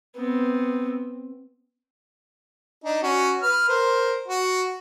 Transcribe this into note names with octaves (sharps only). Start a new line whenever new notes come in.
B3 C4
D4 D#4
C#4 F#4
B4 F6
A#4 C5
F#4